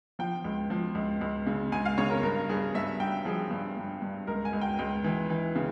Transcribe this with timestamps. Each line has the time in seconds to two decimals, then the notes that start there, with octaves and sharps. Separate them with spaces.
0.19 F3 G5
0.45 C#2
0.70 F3
0.95 C#2
1.21 C#2
1.46 C#3
1.72 C#2 G#5
1.85 F5
1.98 C#3 C#5
2.10 A#4
2.23 G2 A#4
2.49 G2 G#4
2.74 G2 E5
3.00 G2 G5
3.25 F3 G#4
3.51 G2
3.77 G2
4.02 G2
4.27 C#2 A#4
4.45 G#5
4.53 C#2
4.61 G5
4.79 C#2 G5
5.04 E3
5.30 E3
5.55 C#3